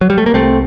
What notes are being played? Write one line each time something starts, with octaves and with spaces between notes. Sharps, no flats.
F#3
G3
A3
A#3
C2 A3 C4